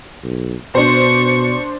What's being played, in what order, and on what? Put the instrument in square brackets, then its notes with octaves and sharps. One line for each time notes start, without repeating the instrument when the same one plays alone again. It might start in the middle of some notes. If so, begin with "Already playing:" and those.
[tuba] B1
[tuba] B2 [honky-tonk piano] D4 C5 [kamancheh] C#6